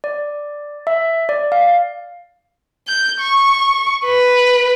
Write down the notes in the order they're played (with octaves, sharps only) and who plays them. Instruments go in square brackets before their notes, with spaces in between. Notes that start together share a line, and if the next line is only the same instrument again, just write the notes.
[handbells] D5
E5
D5
F5
[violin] G6
C#6
B4